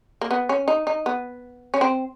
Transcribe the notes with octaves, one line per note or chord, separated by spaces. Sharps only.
A#3
B3
C#4
D#4
D#4
B3
C#4
C4